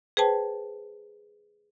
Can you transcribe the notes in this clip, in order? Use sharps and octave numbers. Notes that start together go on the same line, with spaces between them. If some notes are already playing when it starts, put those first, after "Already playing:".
G#4 B4 C5 G5 A5